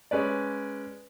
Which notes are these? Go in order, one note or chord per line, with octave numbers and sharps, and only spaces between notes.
G#3 C#4 B4 D5